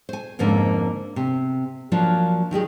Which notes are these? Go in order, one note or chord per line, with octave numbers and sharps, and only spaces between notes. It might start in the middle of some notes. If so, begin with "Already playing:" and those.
C5 G#5
F2 G#2 D3 A#3 C#4 B4
C3
F3 F#3 A#3 D4
D#3 F#3 G4 G#4